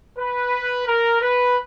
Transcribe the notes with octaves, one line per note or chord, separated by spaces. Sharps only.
B4
A#4
B4